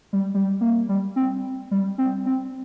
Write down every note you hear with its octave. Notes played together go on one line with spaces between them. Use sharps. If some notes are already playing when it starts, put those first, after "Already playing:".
G3
G3
A#3
G3
C4
G3
C4
C4